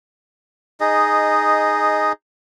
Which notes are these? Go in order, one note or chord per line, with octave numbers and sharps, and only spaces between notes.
D#4 G#4 D#5